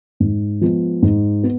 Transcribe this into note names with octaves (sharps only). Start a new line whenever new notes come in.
G#2
F3 G#3 B3
G#2
B3